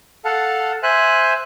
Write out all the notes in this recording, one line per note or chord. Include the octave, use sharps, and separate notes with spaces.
A4 F5 F#5 A5
C5 E5 G#5 F#6